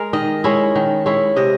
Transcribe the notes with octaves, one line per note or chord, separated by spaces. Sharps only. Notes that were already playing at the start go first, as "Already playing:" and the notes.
Already playing: G#3 A#4
D#3 D#5
G#3 C#4 E4
D#3
G#3 C#4 E4
C3 D#5